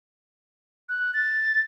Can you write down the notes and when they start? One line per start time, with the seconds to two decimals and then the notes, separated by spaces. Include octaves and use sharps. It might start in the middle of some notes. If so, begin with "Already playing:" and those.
0.89 F#6
1.14 A6